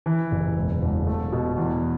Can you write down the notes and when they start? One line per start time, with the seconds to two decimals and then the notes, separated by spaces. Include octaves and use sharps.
0.06 E3
0.31 F#1
0.57 E1
0.82 E1
1.07 A3
1.32 B2
1.57 E2